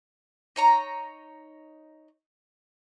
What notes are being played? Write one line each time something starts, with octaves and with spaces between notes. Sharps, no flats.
D#4 C#5 A#5